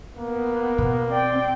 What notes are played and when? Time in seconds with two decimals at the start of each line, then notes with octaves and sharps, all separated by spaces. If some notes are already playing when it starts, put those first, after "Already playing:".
0.17 A#3 B3
0.78 B2
1.11 C4 D5 G5